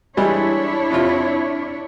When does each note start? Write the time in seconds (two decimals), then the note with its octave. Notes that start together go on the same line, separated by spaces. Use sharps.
0.17 E3 G3 G#3 D4 E4 C#5
0.90 F2 C3 F4